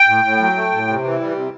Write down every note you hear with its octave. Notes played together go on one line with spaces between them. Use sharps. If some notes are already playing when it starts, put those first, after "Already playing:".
Already playing: G5
A2
A2
F#3
A3
A2
C3
E3
G3
C3